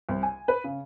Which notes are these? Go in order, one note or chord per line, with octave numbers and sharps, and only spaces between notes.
C2
G#5
B4
C#3